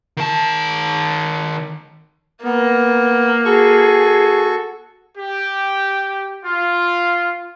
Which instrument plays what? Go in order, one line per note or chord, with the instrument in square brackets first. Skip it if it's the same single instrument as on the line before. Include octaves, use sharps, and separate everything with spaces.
[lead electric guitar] D#3 A5
[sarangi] A#3 [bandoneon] B3
[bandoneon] F#4 A4 C#6 [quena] G#4
[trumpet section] G4
F4